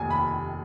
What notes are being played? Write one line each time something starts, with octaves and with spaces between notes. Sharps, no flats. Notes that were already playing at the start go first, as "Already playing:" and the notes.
Already playing: F1 D#2 D#3 G#5
B5